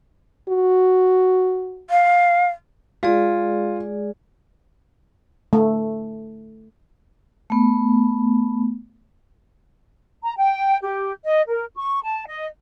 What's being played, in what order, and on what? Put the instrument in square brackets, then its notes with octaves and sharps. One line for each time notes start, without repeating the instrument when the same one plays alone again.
[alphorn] F#4
[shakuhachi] F5
[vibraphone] G#3 G#4 D5 [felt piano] F4
[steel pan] A3
[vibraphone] A3 B3
[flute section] A#5
G5
G4
D#5
A#4
C#6
A5
D#5